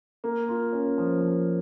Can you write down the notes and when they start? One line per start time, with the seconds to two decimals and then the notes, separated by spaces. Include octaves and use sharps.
0.24 A#3
0.48 F4
0.73 C#4
0.98 F3
1.21 F3